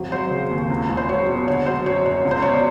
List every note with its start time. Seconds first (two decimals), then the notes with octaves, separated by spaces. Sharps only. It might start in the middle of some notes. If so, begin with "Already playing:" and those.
Already playing: G#1 F#3
0.12 F#3 C5
0.31 C#3
0.51 D#2
0.70 C#2
0.89 C#2
0.97 C5
1.08 F#3 C#5
1.29 B2
1.47 D3 C#5
1.66 F#3 C5
1.86 F#2 C#5
2.05 F#2 C#5
2.25 C#2
2.31 C5
2.42 B2 C#5
2.53 D5